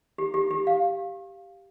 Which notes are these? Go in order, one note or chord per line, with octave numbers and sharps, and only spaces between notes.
G4
G4
G4
F5